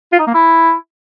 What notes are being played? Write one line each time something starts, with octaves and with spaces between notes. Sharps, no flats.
F4
D#4
A#3
E4